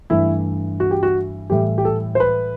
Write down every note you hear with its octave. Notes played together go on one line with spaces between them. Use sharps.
G2 E3 A3 E4
F#4
G4
F#4
A2 E3 G3 G4
G4
A4
C5
B4